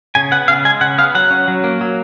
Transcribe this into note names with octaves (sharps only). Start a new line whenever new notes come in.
C#3 G#5
B3 F#5
C#3 F5
G#3 G#5
C#3 F#5
B3 F5
F#3 F#5
C#4
F#3
A#3
F#3